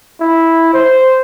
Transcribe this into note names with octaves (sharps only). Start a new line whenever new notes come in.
E4
C5